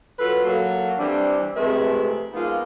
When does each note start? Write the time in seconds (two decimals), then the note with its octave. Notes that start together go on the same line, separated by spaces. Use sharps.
0.19 F#3 F4 A4 B4
0.44 F#3 A#3 A4
0.98 E3 G3 C4 D4
1.56 F2 C3 G#3 A3 B4 E5
2.33 F3 G#3 A#3 B3 D#4 F4